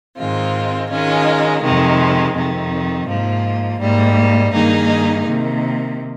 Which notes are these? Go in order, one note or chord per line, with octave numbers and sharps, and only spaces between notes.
G#2 D#3 G#3 C4 F4
D#3 G#3 C#4 F4
F2 C3 D#3 G#3
F2 C3 D#3
G#2 F3 A#3
G#2 G3 A#3
G2 D#3 A#3 D#4 G#4
C3 D#3 A#3